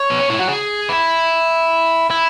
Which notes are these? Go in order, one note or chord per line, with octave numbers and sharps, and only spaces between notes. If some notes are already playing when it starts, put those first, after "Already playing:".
Already playing: C#5
B3
C#4
E4
F#4
G#4
E4
E4